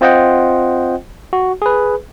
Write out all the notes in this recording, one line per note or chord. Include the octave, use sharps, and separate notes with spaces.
C4 F4 C5 D#5 F#5 G5
F#4
G#4 B4